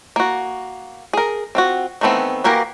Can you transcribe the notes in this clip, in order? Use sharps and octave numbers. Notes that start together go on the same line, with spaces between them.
A#3 F#4
G#4 A#4
C4 F4 F#4
D#3 E3 A3 B3 C4
E3 A#3 F#4 G4 A#4